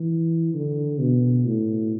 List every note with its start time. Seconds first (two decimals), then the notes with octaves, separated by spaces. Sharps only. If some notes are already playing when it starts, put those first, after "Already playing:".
Already playing: E3
0.54 D3
1.00 B2
1.46 A2